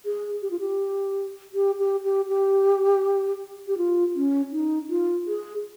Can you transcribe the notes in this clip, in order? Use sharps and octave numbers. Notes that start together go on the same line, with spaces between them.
G#4
G4
F4
G4
G4
G4
G4
G4
G4
F4
C#4
D#4
F4
G#4